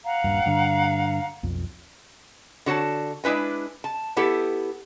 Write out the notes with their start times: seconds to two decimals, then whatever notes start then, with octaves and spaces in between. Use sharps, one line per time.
0.05 F5 F#5 A#5
0.24 D#1 G2
0.46 G2 D3
1.43 B1 F2
2.66 D3 F#4 C#5 A5
3.24 G#3 D4 E4 B4 G#5
3.84 A5
4.17 B3 E4 G4 A4